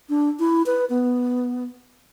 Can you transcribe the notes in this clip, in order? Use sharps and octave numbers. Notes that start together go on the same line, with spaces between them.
D4
E4
B4
B3